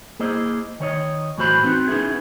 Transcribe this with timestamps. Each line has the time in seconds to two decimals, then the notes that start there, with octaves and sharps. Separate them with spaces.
0.20 A#3 E4 G#4 C5 D#5
0.80 D#3 C#5 D#5
1.38 A2 E3 F#4 C5 B5
1.63 B3 C4 D#4 F#4
1.88 B3 C#4 D#4 E4 G#4